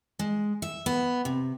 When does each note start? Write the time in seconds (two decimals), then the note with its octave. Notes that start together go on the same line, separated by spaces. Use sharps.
0.19 G#3
0.62 E5
0.86 B3
1.25 C3